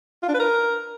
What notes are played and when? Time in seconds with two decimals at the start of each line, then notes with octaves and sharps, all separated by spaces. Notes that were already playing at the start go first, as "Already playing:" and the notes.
0.23 F4
0.28 D4
0.34 B4
0.40 A#4